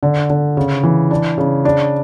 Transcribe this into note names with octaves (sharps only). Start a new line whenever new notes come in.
D3
D3
C#3
E3
D4
C#3
D4